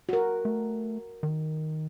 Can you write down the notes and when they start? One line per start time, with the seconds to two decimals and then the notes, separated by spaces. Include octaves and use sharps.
0.09 F#4 A#4
0.45 A3
1.23 D#3